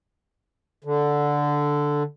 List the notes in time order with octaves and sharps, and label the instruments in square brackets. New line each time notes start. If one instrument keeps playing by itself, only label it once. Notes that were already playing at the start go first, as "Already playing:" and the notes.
[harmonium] D3